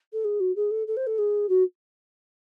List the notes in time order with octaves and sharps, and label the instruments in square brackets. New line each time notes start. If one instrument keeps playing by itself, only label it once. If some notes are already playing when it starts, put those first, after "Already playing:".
[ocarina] A4
G#4
F#4
G#4
A4
A4
C5
A4
G#4
F#4